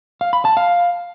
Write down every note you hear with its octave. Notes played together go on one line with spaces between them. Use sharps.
F5
B5
A5
F5